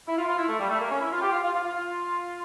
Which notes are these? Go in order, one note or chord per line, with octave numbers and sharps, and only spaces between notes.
E4
F4
F4
E4
A3
G3
A3
A#3
C#4
E4
F4
G4
F4
F4
F4
F4
F4